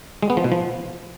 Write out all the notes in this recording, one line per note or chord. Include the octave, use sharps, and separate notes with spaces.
G#3
B3
F3
B2
F3